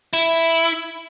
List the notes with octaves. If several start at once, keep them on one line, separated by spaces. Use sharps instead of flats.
E4